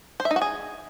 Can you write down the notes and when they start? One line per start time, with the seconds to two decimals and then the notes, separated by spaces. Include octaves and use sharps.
0.20 C5
0.25 E5
0.31 D#4
0.36 F#4
0.42 G#4